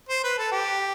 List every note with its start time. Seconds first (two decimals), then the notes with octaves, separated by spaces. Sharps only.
0.09 C5
0.23 B4
0.38 A4
0.52 G4